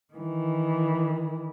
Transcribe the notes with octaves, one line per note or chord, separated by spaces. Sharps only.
D#3 E3